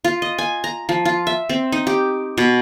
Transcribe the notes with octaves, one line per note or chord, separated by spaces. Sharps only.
F4
D#5
G#5
A#5
F3
F4
E5
C4
D#4
G4
B2